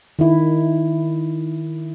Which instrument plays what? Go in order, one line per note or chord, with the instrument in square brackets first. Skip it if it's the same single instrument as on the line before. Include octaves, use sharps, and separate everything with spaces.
[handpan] D#3 E4